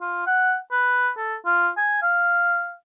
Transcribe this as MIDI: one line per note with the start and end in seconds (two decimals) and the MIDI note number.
0.01 0.24 65
0.27 0.56 78
0.71 1.10 71
1.17 1.35 69
1.46 1.69 65
1.77 1.99 80
2.02 2.74 77